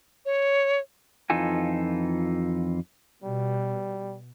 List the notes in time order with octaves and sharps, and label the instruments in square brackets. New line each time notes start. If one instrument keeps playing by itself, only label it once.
[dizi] C#5
[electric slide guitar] F2 E3 D#4 F4 A4 G#5
[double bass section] B2 [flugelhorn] G3